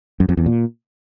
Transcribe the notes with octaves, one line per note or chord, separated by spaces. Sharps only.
F#2
F2
E2
A#2